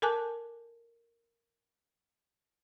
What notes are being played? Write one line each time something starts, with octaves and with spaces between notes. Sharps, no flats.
A4 A#4 G#5 A5 D6 F#6